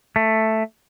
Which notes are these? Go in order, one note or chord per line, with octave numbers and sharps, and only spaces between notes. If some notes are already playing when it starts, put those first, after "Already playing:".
A3